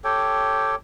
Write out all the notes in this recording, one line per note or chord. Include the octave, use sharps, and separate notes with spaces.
G4 A4 C#5 G5